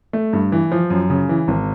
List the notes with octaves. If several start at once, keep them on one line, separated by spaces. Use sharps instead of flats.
A3
G2
E3
F3
F#2
C#3
E3
G#1